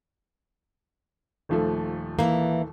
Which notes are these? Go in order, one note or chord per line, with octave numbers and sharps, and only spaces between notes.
D#1 F3 A3
E3 A#3